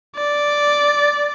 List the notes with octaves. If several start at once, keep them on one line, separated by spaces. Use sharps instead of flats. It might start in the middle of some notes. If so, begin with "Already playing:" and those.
D5